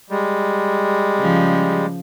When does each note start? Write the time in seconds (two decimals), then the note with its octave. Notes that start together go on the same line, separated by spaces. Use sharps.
0.10 G3 G#3
1.18 C#3 F3